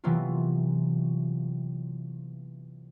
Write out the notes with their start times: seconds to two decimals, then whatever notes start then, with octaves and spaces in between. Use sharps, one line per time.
0.04 C3 E3 F#3 A#3 B3 F4